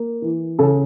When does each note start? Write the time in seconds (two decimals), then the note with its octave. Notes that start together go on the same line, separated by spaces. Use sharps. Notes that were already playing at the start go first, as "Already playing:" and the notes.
Already playing: A#3
0.22 E3
0.59 C#3 A4